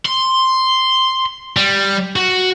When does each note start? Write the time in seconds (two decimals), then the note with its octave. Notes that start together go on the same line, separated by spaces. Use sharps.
0.06 C6
1.57 G3
2.16 F#4